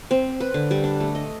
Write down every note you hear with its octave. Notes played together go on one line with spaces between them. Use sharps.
C4
B4
D3
G3
D4
A3
D#5